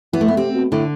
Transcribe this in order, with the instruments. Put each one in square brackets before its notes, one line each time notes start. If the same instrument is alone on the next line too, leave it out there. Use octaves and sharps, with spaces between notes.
[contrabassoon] E3 [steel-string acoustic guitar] B3
[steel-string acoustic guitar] A3
B3
[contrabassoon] C3 [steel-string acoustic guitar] C4
[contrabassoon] B2
[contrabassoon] A2 [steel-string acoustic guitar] D3